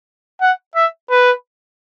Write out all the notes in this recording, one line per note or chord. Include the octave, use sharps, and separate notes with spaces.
F#5
E5
B4